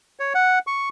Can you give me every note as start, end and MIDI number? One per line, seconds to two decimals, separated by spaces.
0.19 0.33 73
0.35 0.59 78
0.67 0.89 85